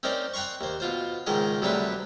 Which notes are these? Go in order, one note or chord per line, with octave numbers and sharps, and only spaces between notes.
C4 C#4 D#4 A#4 C5 D5
F#5 G5 A#5 C6 C#6
D#2 C5
B2 F4 C5
C#2 G#2 D#3 G#3 D#5
D2 C3 F#3 G3 D4 B4